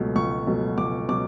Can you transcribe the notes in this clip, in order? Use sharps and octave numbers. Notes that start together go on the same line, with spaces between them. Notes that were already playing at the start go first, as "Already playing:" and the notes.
Already playing: C#2 B2 F#3 A3
C#2 C#6
B2 F#3 A3
C#2 D6
B2 F#3 D6